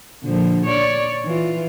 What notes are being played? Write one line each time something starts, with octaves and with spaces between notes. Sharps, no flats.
A#2 D3 F3
C#5 D5
E3 F4